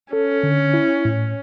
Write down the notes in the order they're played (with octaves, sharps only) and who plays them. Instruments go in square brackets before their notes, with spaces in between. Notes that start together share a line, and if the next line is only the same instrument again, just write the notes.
[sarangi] C#4 [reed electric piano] A4
[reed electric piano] D3
E4
A2